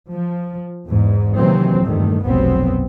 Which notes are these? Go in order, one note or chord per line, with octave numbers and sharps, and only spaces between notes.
F3
E2 G#2
C3 D#3 E3 F#3 A#3 C4
E2 G2 A#2 D#3 A3
F1 B1 G2 F#3 B3 C4